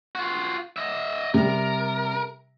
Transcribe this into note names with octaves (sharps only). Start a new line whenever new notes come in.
F4 F#4
D#5 E5
C3 G3 A#4